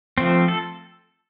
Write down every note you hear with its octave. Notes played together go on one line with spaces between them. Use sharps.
F3 A3 C4
A4